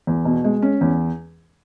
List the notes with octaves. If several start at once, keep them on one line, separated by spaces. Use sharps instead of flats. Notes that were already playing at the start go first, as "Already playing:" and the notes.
E2
B2
G#3
C#4
E2